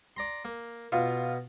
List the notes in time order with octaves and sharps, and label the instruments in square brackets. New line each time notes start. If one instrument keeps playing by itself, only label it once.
[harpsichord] D5 A#5 C6
A#3
[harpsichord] B2 [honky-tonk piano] F4